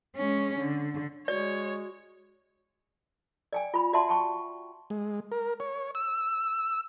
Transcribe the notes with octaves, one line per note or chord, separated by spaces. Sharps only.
G#3 C#4
D3
G#3 F#4 C#5 D5
D5 G5 G#5
F4 B5
F#4 D5 E5 F#5 A5 C6
G5 A5 C#6
G#3
A#4
C#5
E6